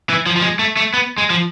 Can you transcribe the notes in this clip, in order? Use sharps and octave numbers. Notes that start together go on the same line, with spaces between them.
E3
F3
F3
G#3
A3
A3
B3
G#3
F3